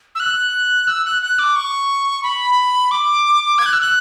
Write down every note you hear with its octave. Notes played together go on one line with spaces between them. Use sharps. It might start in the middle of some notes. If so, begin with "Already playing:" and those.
E6
F#6
E6
F#6
F#6
D6
C#6
B5
D6
G#6
F#6
E6
F#6